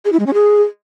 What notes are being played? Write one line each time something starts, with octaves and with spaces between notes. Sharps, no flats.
G#4
E4
G#3
C#4
G#4